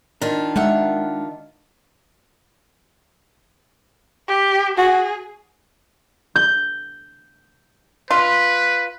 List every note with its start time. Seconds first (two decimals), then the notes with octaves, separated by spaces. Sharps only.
0.22 D#3 D4 F4
0.56 G#3 A#4 E5 F#5
4.28 G4
4.78 F#4 G#4
6.36 G6
8.11 F4 B4